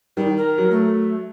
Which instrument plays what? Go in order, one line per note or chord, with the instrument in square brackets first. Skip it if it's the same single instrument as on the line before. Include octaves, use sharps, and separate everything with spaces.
[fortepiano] D#3 [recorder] G3
[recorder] A#4
[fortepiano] F#3
[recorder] A3